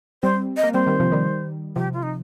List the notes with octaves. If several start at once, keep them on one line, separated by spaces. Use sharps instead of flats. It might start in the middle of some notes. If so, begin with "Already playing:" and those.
G3 C4 C5
D#5
A#3
G3 C4 C5
D#3 G3
C3 F3
D#3 G3
C3 F3 G4
F4
D#4